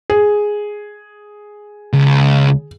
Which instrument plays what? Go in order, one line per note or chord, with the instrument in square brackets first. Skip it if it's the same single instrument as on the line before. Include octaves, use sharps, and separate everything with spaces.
[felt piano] G#4
[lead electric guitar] C#2